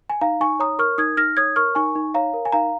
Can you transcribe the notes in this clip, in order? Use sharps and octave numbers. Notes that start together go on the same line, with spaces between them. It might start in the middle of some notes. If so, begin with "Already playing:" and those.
G#5
D#4 F5 A#5
D#4 G#5 C#6
C#5 A#5 D#6
A#4 C#6 F6
D#4 D#6 G#6
D#4 F6 A#6
C#5 D#6 G#6
A#4 C#6 F6
D#4 G#5 C#6
D#4
C#5 F5 A#5
A#4
G#5
D#4 F5 A#5